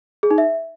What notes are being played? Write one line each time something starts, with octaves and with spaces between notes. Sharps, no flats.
G#4
D#4
E5